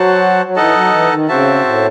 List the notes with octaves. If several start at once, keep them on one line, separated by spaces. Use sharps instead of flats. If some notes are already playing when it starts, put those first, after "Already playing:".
Already playing: F#3 F#4 C5 F#5 A5
F#3
E3 D#4 A4 D#5 F#5 A5
F#3
E3
D#3
C#3 C4 F#4 C5 E5 A5
A2